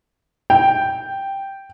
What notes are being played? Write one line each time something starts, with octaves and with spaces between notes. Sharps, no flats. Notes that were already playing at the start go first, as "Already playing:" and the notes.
G5